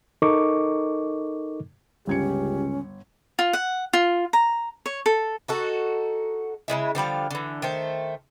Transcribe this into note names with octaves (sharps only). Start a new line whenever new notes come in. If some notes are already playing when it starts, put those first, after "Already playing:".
D#4 A4 A#4 D#5 C#6 D6
G1 C#2 C#4 G4 G#6 C#7
F4
F#5
F4
A#5
C#5
A4
D#4 F#4 A4
C#3 E3 G#3 E4
D3 F3 G3 F5
D3 E3
D#3 A3 C5